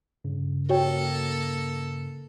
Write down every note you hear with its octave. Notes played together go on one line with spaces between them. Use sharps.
G2 C#3
A#3 F#4 A4 C#5 G5